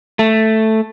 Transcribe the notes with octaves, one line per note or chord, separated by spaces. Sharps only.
A3